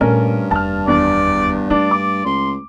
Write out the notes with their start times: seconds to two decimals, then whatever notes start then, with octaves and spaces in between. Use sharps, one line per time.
0.01 G2 A#2 A3 C#4 A#4
0.51 F1 D#2 A5 F6
0.87 E2 D4 D5
1.70 A3 D4 D5
1.91 D6
2.25 C#2 C6